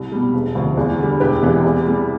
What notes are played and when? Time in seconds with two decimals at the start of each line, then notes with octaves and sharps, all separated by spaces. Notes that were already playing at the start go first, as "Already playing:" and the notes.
Already playing: C2
0.12 B2 G3
0.34 E1
0.55 D2 C3 F3
0.77 E2
0.99 D3 G3
1.20 E1 G4 B4
1.42 E2 C3 E3
1.64 E2
1.86 C3 G3